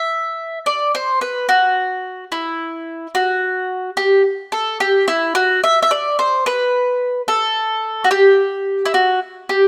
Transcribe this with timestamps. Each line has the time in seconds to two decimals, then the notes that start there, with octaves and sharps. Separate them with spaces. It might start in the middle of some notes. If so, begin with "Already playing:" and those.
Already playing: E5
0.66 D5
0.95 C5
1.21 B4
1.49 F#4
2.32 E4
3.15 F#4
3.97 G4
4.52 A4
4.80 G4
5.08 E4
5.35 F#4
5.64 E5
5.83 E5
5.91 D5
6.19 C5
6.46 B4
7.28 A4
8.04 F#4
8.11 G4
8.85 E4
8.94 F#4
9.49 G4